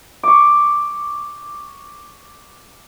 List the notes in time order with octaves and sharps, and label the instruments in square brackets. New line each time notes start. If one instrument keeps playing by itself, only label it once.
[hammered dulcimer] C#6 D6